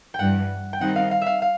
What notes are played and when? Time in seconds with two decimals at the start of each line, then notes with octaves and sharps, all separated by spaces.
0.14 G5
0.19 G2 E3 G3 F#5
0.73 G5
0.81 D#3 G3 C4 D#4 F#5
0.96 F5
1.11 F5
1.21 E5 F5
1.42 F5